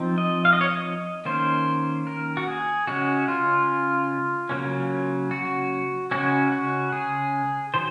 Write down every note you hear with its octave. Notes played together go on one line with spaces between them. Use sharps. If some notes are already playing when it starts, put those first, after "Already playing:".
Already playing: F3 C4 D#4
D#5
F5
D#5
C#5
D#5
D#3 A#3 C#4 C5
A#4
F#4
G#4
C#3 G#3 C#4 F#4
F4
C#3 F#3 A#3 C#4
F#4
C#3 G#3 C#4 F#4
F#4
G#4
D#3 F#3 C5